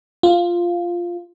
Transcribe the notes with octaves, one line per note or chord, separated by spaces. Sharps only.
F4